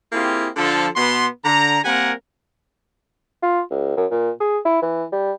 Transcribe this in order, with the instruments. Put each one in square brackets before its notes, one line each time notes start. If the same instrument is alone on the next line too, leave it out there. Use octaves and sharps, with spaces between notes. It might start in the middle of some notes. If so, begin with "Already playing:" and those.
[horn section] A#3 C4 E4 F4 G4 G#4
D3 F3 A4
B2 B3 C6
D3 A#5
G3 A#3 C4 A#4 F#5 G#5
[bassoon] F4
C#2
F#2
A#2
G#4
E4
E3
G3